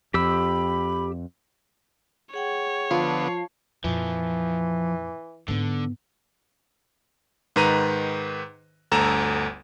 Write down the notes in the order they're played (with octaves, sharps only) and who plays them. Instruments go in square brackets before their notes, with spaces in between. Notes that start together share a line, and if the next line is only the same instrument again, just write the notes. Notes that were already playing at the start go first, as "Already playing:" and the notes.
[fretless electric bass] F2 [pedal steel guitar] G4 E6 [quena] B5
[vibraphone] G#4 F#5 G5 [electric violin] C#5
[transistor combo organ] D3 B3 [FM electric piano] F3 F4 C7 [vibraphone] A5
[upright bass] F2 A#2 [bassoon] E3 [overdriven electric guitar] F3
[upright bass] G#2 B3 [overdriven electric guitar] D3
[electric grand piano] G#2 D#3 B4 A#5 D#7
G1 D2 A4 A#5 E7